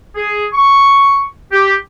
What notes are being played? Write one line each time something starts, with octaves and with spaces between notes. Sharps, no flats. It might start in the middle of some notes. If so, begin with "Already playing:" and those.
G#4
C#6
G4